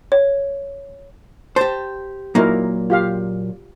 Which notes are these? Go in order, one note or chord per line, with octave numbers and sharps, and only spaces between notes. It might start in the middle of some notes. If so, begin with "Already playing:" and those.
C#5
G4 C5 A5
A#2 F#3 A#3 D#4 E4 A#4
F4 G4 F5